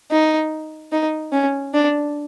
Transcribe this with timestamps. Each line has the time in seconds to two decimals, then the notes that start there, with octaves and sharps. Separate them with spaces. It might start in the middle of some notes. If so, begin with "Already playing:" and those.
0.11 D#4
0.92 D#4
1.32 C#4
1.74 D4